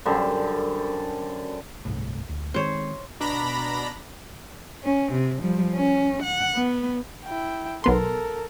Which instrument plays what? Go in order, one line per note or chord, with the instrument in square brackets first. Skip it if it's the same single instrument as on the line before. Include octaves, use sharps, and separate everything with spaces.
[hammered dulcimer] F#2 D3 G3 C5
[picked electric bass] G1 C2 A2
D2
[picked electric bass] D#3 G#3 C4 [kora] C5 C#5
[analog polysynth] B2 D4 A#5 B5 A#6
[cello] C#4
C3
F3 G3
C#4
F#5
B3
[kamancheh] E4 G5
[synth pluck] B1 B3 C6 [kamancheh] A4 A#4